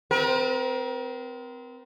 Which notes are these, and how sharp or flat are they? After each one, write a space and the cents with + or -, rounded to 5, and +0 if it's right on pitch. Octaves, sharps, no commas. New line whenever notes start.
C4 -25 A#4 +35